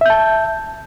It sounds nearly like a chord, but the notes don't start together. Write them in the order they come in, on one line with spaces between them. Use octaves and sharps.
E5 G6 A5